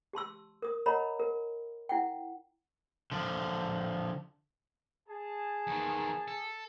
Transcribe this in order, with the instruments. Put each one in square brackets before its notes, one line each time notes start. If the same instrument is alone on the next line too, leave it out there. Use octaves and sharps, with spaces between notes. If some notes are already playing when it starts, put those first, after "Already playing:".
[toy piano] G4 A5 C6 E6
A#4 D#6
A#4 C#5 D#5 F#5 A#5 B5
A#4
E4 F#5 G5
[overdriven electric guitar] D3 F3
[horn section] G#4 A5
[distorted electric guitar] E2 D#3
A4